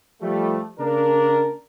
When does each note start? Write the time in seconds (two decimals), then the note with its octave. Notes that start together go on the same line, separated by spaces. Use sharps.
0.22 F3 G3 A3
0.79 C#3 A#3 D4 A#4